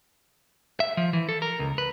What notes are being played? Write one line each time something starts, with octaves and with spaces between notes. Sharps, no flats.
E5
F3
E3
A4
A#4
C#2
B4